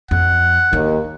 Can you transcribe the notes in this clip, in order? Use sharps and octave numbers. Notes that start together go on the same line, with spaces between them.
F2 F#5
D#2 D#4